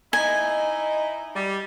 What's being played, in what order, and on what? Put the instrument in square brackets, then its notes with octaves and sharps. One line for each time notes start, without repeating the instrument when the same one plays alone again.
[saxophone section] D#4 E4 D#5 [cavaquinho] G#5
[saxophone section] G3